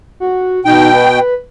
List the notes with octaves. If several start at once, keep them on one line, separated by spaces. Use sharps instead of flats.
F#4
B2 D#4 G5
B4